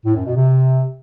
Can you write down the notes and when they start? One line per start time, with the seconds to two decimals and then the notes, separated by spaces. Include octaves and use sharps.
0.05 A2
0.15 F#2
0.25 B2
0.36 C3